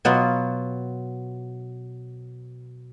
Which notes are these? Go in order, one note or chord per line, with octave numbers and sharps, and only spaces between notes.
B2 F#3 B3 F4